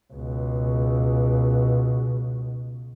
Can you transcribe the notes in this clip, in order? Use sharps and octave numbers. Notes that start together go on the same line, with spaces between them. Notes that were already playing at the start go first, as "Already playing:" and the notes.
C#2 B2